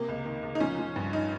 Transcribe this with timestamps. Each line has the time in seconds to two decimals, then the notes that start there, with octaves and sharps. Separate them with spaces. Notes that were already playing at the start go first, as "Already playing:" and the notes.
Already playing: C3 A#3
0.08 C#2
0.26 D#3
0.43 C#2
0.55 D#4
0.60 F3 C#4
0.79 F3
0.96 G2
1.13 D#4